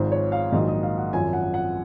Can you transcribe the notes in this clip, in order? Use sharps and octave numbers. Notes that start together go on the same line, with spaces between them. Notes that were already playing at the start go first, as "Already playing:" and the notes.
Already playing: G#1 G#2 F3 C5
C#5
F5
A#1 G#2 D#3 F#3 D#5
D#5
F5
F#5
G#1 F#2 F3 G#5
F#5
F#5